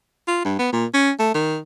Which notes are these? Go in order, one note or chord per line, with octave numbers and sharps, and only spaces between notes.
F4
G2
B3
A#2
C#4
A3
D#3